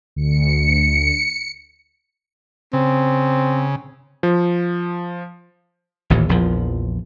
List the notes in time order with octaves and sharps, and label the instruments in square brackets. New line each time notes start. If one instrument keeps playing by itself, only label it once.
[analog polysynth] D2 [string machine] C#7
[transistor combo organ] C#3 [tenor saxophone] C4
[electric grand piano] F3
[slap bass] A1 D#2 A#2 E3
A#1 E2 F3